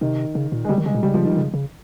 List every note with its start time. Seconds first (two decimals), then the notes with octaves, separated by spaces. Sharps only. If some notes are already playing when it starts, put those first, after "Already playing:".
0.01 C3 D#3
0.35 C#3
0.52 A#2
0.65 G#3
0.69 C#3 G3
0.78 D#3
0.86 C#3 G#3
0.95 A#2
1.03 C#3 G3
1.14 F3
1.25 D#3
1.37 C#3
1.54 C#3